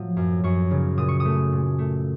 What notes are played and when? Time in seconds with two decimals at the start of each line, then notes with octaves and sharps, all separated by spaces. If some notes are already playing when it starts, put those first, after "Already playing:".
Already playing: A2 F3 F#3
0.17 F#2
0.44 F#2 C#6
0.71 C#3
0.98 A#2 D#6
1.08 C#6
1.20 D#6
1.25 A3
1.52 A#2
1.78 A3